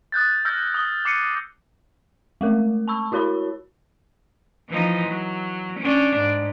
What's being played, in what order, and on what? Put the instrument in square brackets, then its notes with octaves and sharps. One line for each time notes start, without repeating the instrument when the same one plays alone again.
[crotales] D#6 F#6 G6 A6
E6 F6 G6 A#6
D#6 G7
D6 C7 C#7 D#7
[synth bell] G#3 A3 A#4
A5 B5 C#6 E6
E4 F#4 A#4 C#5 B5
[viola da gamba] E3 F3 D#4
F#3
C#4 D4
G#2